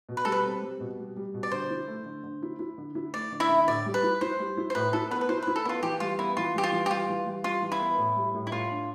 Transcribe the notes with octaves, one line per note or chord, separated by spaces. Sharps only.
B2
B4
G3 A4
B4
C4
G3
B2
G3
G3
B2
D5
D3 C5
E4
A3
D3
D3
E4
E4
D3
E4
A3 D5
D3
E4 E5
D3
A2 D5
G3
B4
E4
E4 C5
G3
E4
C5
A2 B4
E4 A4
B3 B4
B4
E4 C5
B4
E4
A4
B3 E4 F4
E3 G4
G3 F4
B3 E4
E3 F4
G3 G4
F4
E3
G4
G3 F4
E3
G3
G3 F4
E3
E4
B3
A2
G3
A2
E4
A2 F4
D4